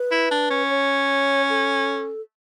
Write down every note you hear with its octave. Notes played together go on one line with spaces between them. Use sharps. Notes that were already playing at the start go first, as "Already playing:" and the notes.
Already playing: B4
E4
D4
C#4
C#5
A4